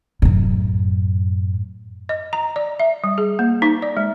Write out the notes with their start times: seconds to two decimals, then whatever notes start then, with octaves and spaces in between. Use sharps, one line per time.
0.22 F#2 A2
2.09 D#5
2.33 A#5
2.56 D5
2.80 E5
3.04 G3
3.18 G#4
3.39 A#3
3.62 D#4
3.82 D5
3.97 G#3